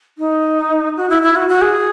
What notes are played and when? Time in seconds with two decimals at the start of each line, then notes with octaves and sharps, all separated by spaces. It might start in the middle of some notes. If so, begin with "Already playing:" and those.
0.18 D#4
0.97 F#4
1.10 E4
1.22 E4
1.36 F#4
1.49 F#4
1.61 G#4